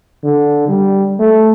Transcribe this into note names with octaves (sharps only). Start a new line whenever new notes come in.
D3
G3
A3